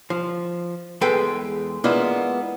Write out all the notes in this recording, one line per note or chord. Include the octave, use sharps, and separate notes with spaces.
F3
E2 G#3 A4 B4 G5 G#5
G#3 A#3 B3 D4 E4 F4